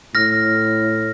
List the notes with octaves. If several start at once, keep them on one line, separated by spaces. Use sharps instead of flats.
A2 F6 A#6